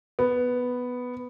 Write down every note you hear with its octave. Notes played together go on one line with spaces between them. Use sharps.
B3